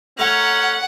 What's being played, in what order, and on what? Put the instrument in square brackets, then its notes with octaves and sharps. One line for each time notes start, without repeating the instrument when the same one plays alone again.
[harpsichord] A3 A#5 [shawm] C#4 [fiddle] F#5